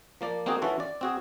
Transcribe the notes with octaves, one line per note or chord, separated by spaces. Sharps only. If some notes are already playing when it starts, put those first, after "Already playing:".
F3 A#3 D5
A#3 C4 D#4 F#4 G#4
E3 C#4 F4 F#4 A4
D5
C4 F#4 G#4